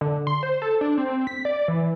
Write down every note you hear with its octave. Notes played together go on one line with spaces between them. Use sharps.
D3
C6
C5
A4
D4
C4
B6
D5
E3